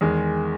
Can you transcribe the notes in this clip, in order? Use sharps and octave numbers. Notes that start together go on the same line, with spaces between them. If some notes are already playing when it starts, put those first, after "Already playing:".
E2 D#3 G#3